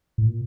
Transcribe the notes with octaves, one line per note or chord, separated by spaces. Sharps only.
A2
A#2